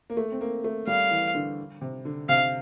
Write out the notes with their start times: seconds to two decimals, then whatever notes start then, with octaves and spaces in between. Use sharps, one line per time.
0.10 A#3
0.17 A3
0.32 C4
0.41 A#3
0.64 A3
0.87 G3 F5
1.11 E3
1.35 D3
1.81 C3
2.05 D3
2.29 C3 F5